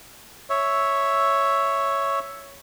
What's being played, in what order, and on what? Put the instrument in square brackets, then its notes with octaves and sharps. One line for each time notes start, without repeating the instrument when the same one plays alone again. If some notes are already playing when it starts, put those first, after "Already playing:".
[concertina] C#5 E5